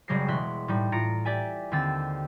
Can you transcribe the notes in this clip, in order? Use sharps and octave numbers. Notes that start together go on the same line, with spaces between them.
F#1 C#3 G3 G#3 A#6 C7
E1 E5 C6 F#6
A2 G3 D#4
A2 F4 A#5 A#6 C#7 D7
G4 D5 E5 G#5
D#2 D3 C4 E6 A6